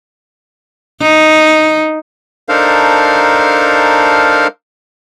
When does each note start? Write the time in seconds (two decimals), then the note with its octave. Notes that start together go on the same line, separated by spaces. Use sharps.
1.01 D#4
2.49 D4 D#4 A4 A#4 C5 F5